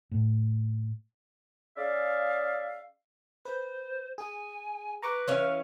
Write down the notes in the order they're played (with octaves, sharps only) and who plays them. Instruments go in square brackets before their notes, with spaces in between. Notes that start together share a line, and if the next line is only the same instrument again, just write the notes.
[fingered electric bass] A2
[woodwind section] C#4 G#4 D5 E5 F5
[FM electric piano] B4 [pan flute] C5
[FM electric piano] G#4 [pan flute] G#5
[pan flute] B4 [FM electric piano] A#5 C#6 D6
[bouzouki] E3 C#4 F5 [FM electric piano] C#5